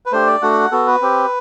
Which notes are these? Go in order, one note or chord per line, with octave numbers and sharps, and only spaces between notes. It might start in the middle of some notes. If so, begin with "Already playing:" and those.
B4
A3 D4 G4 C5
D5
A3 D4 F#4 F#5
B3 F#4 A4
B4
C4 G4